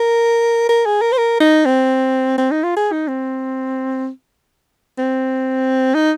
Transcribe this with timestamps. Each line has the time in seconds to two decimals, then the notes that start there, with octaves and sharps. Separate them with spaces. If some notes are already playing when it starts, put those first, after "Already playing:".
Already playing: A#4
0.69 A#4
0.86 G#4
1.01 A#4
1.12 C5
1.18 A#4
1.40 D#4
1.65 C4
2.38 C4
2.51 D#4
2.63 F4
2.77 G#4
2.92 D#4
3.08 C4
4.98 C4
5.95 D#4